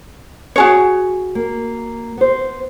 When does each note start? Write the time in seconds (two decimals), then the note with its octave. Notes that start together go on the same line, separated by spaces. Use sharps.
0.56 F#4 G#4 C#5
1.35 A#3
2.17 B3 C5